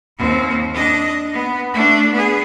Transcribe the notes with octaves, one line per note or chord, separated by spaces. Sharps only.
D#2 C4
D4 D#5
B3
A3 D4
B3 G#4